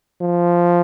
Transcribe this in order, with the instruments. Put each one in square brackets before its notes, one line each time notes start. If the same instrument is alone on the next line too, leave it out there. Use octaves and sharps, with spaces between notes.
[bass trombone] F3